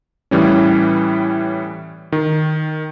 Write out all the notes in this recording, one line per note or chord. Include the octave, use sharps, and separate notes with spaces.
A2 E3 G3 C#4
D#3